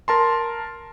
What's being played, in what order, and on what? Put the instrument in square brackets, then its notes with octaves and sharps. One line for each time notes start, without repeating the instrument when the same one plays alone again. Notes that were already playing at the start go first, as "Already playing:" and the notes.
[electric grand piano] A#4 A5 C6